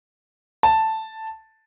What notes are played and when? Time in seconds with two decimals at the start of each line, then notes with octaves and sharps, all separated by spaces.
0.63 A5